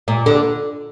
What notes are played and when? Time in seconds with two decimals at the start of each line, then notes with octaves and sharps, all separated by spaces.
0.08 A#2
0.26 D3